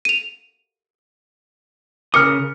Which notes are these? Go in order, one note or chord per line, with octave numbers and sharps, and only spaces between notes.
D#7 F7
C#3 A#4 D6 D#6 F6 C#7